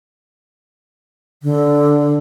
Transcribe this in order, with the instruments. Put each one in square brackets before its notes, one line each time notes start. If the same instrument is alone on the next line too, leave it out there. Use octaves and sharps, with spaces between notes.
[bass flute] D3